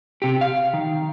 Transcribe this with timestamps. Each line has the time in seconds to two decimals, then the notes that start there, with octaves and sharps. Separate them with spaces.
0.22 C3 G4
0.41 F5
0.74 D#3